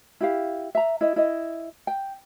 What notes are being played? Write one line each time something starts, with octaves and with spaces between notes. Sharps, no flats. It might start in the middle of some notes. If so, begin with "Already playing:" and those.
E4 G4 F5
E5 A#5
E4 D#5
E4 D#5
G5